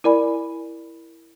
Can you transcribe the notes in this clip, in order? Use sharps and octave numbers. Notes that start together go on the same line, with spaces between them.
E4 A#4 D5 G#5 B5